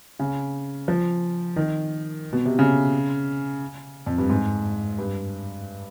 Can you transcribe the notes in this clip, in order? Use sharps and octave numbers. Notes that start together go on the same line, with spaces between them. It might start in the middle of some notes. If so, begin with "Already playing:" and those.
C#3
F3
D#3
B2
C3
C#3
F2
G2
G#2
G2